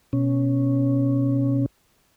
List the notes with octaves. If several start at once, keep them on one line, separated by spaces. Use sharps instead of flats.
B2 C#4